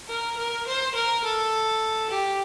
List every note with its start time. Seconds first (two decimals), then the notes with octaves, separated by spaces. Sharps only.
0.08 A#4
0.37 A#4
0.66 C5
0.95 A#4
1.24 A4
2.10 G4